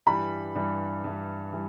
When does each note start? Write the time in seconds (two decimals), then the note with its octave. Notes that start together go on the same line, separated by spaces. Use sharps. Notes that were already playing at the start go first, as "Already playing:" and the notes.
0.06 G2 E3 G3 B5
0.55 G2 E3 G3
1.04 G2 E3 G3
1.53 E3 G3